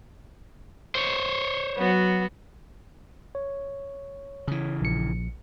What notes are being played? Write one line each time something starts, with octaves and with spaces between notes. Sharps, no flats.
C5 C#5
F#3 B3 F#4
C#5
C#3 E3
A#1 C#7